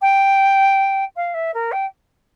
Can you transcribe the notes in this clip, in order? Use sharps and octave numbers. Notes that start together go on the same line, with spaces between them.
G5
F5
E5
A#4
G5